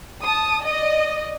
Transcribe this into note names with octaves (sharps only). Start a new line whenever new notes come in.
A5 D#6
D5 D#5 D#6